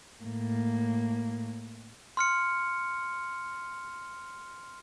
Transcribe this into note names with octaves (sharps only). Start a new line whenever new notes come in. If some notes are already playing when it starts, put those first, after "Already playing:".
A2 A#3
C6 F6 C#7